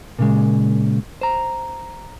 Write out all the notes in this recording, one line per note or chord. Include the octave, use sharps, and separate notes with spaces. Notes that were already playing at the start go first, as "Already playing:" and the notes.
A#2 C#3 G#3
C5 A#5